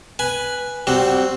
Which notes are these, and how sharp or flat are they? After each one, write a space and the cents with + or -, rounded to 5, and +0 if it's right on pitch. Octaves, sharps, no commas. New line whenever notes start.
B4 -5 G#5 +0
G3 -20 C4 +0 F#4 +0